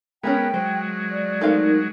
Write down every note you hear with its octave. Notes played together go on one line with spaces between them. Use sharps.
G#3 B3 C#4 G#4 A#4 G5
F#3 G#3 C5
D5
A3 C4 D#4 A#4 F5